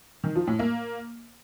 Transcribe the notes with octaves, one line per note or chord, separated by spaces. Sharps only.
D#3
F3
A2
A#3